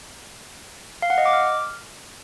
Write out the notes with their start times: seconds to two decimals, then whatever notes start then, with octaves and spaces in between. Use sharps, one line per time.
1.02 F5
1.10 F#5
1.18 D#5
1.25 D6
1.33 F6